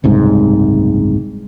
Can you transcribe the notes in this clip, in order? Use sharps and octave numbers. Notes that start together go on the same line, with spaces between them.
F#1 C2 G#2